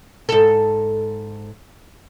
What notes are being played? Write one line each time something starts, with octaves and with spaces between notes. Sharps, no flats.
G#2 A4